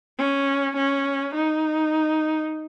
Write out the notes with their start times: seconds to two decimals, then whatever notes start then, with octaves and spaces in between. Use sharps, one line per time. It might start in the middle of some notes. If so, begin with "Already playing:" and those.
0.19 C#4
0.77 C#4
1.35 D#4